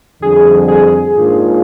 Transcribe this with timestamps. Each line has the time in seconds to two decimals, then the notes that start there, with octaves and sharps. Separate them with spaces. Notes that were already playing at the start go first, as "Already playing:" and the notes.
0.22 F2 D3 G3 G#4
0.68 G#4
1.15 G#2 D#3 A#3 D4 F4